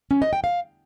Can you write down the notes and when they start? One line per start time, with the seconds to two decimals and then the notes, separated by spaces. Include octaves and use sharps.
0.11 C#4
0.22 D#5
0.33 G5
0.44 F5